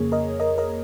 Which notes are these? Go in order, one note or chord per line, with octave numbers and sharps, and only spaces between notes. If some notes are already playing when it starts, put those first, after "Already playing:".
Already playing: F2 C#3 A#3 G#4 C#5
A#4 D#5
A#4 D#5
A#4 D#5